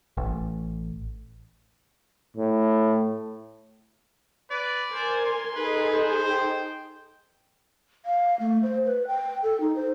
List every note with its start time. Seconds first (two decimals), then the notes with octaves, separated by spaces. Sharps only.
0.17 A1
2.37 A2
4.51 B4 D5
4.92 A#4 C5 G#5
5.25 C6
5.56 D#4 G#4 A4 B4
5.94 C5
6.30 G5
8.05 F5
8.40 A3
8.63 C5
8.85 B4
9.07 G5
9.43 A4
9.61 D#4
9.76 C5